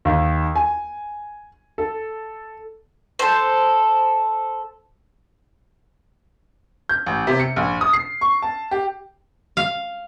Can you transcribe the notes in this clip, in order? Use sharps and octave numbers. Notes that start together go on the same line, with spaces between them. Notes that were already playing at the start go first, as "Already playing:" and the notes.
D#2
G#5
A4
A4 C5
G6
A1
C3
C#7
A#1
D#6
C7
C#6
A5
G4
F5